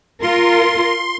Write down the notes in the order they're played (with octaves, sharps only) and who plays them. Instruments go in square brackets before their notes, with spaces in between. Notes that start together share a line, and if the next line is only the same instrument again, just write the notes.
[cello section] F4 A#4 [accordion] C6